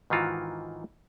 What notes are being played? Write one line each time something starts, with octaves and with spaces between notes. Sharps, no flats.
G#2 D#3 E3 F4 F#4